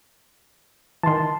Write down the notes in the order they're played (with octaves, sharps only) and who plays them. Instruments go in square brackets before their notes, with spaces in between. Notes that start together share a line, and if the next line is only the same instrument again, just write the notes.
[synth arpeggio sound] D#3 E3 [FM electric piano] A5 C6